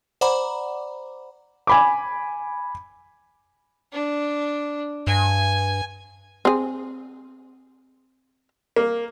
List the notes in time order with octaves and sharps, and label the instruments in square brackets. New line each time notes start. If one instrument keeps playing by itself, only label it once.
[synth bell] C5 D5 F#5 A#5 B5 D6
[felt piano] G#5 B5 D6
[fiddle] D4
[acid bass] G2 [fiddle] G#5
[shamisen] C4 G#4
[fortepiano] A#3